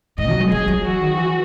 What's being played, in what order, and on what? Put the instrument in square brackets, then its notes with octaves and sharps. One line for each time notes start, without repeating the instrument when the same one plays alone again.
[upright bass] G#2 [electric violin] D#5
[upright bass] F#3
G#3
[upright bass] F#3 [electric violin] G#4
[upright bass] F#3
[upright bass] E3 [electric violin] F#4
[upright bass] D#3
E3